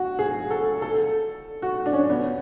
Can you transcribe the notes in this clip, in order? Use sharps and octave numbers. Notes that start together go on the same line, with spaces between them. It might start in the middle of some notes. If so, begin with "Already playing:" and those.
Already playing: F#4
G#4
A4
A4
F#4
D4
C#4
B3